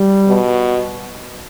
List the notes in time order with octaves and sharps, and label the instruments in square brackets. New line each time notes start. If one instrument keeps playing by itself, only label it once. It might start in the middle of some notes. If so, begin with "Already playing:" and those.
Already playing: [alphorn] G3
[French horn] B2